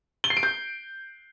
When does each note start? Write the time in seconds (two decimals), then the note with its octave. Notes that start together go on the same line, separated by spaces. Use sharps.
0.24 G7
0.30 C7
0.37 D7
0.43 G6